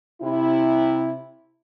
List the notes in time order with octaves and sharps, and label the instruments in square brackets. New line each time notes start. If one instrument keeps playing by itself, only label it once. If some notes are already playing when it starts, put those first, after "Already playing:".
[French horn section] C3 E4